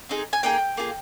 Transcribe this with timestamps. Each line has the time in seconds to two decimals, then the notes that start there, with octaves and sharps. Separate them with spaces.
0.09 C4 D#4 G#4
0.33 G#5
0.43 A#3 D#4 G#4 G5
0.77 A#3 F4 G#4